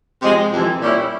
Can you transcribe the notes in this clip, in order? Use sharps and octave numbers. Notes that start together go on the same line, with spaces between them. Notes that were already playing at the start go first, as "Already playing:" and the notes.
C3 F3 G#3
F2 C3 E3
A#2 G3 C#4 E4